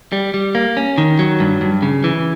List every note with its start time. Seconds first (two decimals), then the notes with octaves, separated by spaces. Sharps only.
0.12 G3
0.34 G3
0.55 A#3
0.77 C#4
0.98 D#3
1.19 F#3
1.40 G2
1.61 G2
1.82 C#3
2.04 E3